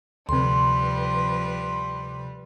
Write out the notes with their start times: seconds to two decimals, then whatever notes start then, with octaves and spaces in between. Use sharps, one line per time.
0.29 D2 C3 F3 G3 B4 C6